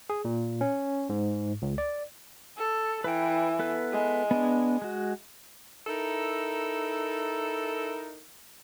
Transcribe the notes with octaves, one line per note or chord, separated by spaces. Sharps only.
G#4
A#2
C#4
G#2
C#2
D5
A4
E3 B4 G5
B3 A4 B4
G#3
B3 D4
G#3 F#4
D#4 E4 A4 A#4